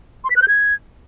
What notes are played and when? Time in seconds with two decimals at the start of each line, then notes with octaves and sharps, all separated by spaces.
0.24 C6
0.30 B6
0.36 F#6
0.42 G6
0.48 G#6